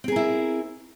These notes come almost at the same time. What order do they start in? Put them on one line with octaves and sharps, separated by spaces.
C4 G#4 A#4 E4